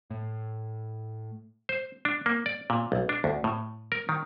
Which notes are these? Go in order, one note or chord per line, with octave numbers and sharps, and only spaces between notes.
A2
C5
D4
A#3
D5
A#2
B1
D4
D2
A2
A#4
D#3